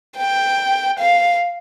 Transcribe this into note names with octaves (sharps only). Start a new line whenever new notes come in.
G5
F5